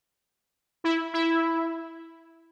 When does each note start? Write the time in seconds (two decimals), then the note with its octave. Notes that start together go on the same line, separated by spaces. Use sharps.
0.84 E4
1.14 E4